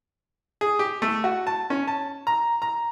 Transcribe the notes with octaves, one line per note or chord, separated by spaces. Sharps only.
G#4
G4
A3
F#4
A5
C#4
A5
A#5
A#5